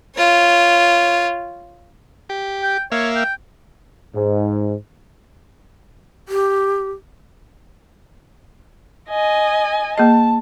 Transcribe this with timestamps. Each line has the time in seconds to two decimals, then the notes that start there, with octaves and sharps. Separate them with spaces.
0.16 F4 C#5
2.29 G4
2.62 G5
2.92 A#3 C#5 E5 F5
3.16 G5
4.15 G#2
6.29 G4
9.10 D#5 G#5
9.98 A#3 G#4 D#5 A5